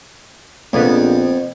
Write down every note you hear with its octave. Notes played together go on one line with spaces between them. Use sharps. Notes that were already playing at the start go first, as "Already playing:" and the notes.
A#1 F2 A#3 B3